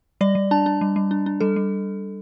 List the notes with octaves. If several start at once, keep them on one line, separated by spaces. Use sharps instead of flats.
G3 D5
G3
D4 A5
D4
G3
G3
D4
D4
G3 A4
G3